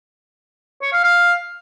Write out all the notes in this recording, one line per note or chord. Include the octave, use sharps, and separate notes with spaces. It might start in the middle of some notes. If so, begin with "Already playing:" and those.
C#5
F5
F5